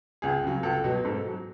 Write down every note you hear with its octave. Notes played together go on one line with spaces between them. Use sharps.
C#2 G#4
C#3 F#3
C#2 A4
B2 F#3
G#2 A4
F#3